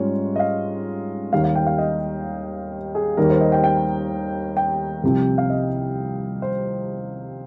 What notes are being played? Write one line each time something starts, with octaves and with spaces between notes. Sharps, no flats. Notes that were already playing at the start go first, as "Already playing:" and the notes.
Already playing: G#2 G3 C#4 F4 C#5
D#5
F5
D#2 D#3 G3 F5
F5
G5
F5
D#5
G#4
D#2 D#3 G3 A#4
C5
D#5
G5
G5
G5
C2 C3 F3
F5
D#5
C5